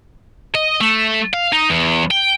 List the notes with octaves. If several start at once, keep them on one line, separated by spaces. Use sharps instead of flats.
D#5
A3
F5
D#4
E2
G5